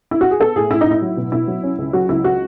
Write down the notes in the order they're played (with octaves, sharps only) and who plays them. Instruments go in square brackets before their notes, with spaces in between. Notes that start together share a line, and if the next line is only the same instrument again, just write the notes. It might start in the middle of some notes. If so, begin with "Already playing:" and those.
[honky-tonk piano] E4
F#4
G#4
B3 A4
A2 G#4
A2 E4
D#4
A2 E4
F#3
B2
B2 E4
F#3
C#4
C#2
F#3 F#4
C#2 E4
F#4